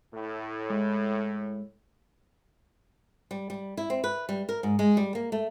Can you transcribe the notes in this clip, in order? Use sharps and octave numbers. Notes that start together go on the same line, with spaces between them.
A2
G#3
G3
G3
E4
C4
B4
G3
A#4
G#2
G#3
G3
A#3
A3